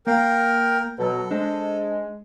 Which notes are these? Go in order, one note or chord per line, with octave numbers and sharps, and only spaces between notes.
A#3 A#4 F5 G5
B2 F#3 A4
G#3 D4 C5 D#5